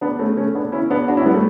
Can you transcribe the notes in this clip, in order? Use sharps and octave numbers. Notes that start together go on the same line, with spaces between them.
B3 D4
A3 C#4
A3 C#4
B3 D4
C#4 E4
B3 D4
D4 F#4
C#4 E4
G3 B3
A3